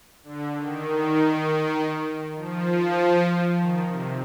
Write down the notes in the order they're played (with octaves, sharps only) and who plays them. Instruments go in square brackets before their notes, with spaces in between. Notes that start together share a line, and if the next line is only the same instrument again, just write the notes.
[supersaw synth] D3
D#3
F3
D#3
C3